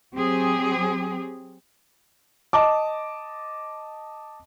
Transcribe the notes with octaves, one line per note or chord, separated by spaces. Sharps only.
F#3 C4 G4 G#4
D#5 A5 D6